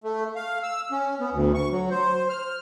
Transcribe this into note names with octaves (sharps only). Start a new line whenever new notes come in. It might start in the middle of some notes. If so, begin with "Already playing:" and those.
A3
F5
E6
C#4
B3
D2
C#6
F#3
C5
F6